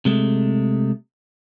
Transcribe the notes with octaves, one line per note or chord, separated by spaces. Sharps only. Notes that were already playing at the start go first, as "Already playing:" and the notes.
C3 G#3 A3